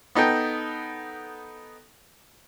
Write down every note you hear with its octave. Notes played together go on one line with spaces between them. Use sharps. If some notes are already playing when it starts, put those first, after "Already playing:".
B3 D#4 A4 G5